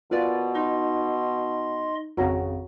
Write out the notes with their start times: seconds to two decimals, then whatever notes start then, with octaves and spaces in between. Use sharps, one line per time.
0.11 B2 F4 A#4 B4 D5
0.55 D#4 D#5 C6
2.17 G#1 F2 C#3 F#4 C#5 A#5